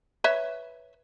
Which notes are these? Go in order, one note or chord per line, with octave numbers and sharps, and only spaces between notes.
B4 C#5 E5